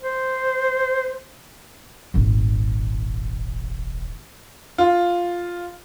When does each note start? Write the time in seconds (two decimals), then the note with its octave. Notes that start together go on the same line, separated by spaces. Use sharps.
0.02 C5
2.14 D#1 G#1
4.78 F4